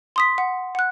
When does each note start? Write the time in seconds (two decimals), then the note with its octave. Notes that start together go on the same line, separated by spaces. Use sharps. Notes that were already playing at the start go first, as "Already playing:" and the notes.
0.16 C6 D#6 B6
0.38 F#5
0.75 F#5 F#6